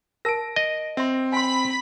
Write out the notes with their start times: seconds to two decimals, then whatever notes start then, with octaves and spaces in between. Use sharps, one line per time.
0.25 A#4 A5 A#6 D7
0.56 D#5
0.97 C4 E5 C6
1.32 G#5 B5 C6 B6